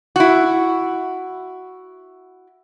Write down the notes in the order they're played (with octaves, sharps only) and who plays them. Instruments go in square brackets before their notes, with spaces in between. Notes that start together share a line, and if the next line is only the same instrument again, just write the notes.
[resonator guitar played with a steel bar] E4 F#4